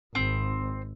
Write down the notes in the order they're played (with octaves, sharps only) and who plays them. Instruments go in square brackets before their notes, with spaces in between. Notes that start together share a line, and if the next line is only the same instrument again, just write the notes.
[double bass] G#1 [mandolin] C4